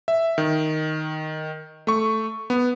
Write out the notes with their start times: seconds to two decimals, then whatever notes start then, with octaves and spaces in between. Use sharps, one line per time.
0.08 E5
0.38 D#3
1.87 A3 C#6
2.50 B3